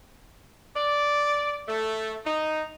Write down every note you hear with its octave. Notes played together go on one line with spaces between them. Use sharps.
D5
A3
D#4